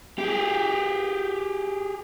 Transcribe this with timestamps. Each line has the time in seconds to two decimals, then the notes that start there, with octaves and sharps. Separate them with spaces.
0.18 G4 G#4